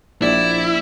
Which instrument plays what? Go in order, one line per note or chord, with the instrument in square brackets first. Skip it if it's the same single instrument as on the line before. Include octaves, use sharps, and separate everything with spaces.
[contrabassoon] A#1 [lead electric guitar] E4 [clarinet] D5